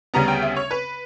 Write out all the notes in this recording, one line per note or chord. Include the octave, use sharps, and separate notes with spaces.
D2 C#3 G3 B3 A#5
G5
E5
C#5
B4